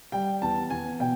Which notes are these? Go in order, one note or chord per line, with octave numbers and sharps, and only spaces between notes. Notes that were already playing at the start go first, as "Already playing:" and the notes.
G3 G5
E2 A5
E2 G#5
B2 G5